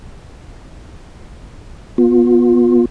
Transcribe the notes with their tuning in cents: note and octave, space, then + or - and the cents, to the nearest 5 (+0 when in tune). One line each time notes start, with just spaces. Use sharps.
B3 -15 F4 +30